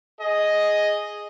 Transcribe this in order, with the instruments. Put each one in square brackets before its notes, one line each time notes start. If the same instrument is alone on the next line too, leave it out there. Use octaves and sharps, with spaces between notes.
[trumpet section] G#4 D#5